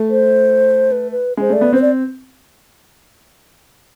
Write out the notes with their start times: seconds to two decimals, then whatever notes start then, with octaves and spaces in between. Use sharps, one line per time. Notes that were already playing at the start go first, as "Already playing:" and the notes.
Already playing: A3
0.10 C5
0.92 B4
1.12 B4
1.37 G#3 C5
1.50 A3 D5
1.61 B3
1.73 C4 C5
1.82 D5